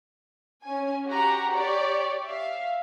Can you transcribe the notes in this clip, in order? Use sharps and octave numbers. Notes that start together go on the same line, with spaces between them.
C#4 G#5
F#4 G4 F#5 A#5
G4 C#5 D5 C#6
E5 F5